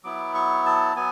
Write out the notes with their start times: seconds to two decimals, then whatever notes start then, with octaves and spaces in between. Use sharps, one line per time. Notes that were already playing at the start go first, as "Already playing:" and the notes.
0.03 F#3 B3 E4 D6
0.35 C#6
0.66 A5
0.96 F#3 B3 G#5